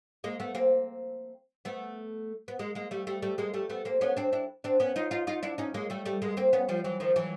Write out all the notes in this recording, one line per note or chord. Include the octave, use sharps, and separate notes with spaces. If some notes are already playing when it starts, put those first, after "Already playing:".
G#3 A#3
A3 B3
A#3 C4
A3 B3
B3
G#3 A#3
G#3 A#3
G3 A3
G3 A3
G3 A3
G#3 A#3
G3 A3
A3 B3
A#3 C4
B3 C#4
C4 D4
D4 E4
C4 D4
B3 C#4
D#4 F4
D#4 F4
D#4 F4
D4 E4
C#4 D#4
G#3 A#3
G3 A3
G3 A3
G#3 A#3
A#3 C4
B3 C#4
F3 G3
E3 F#3
D#3 F3
E3 F#3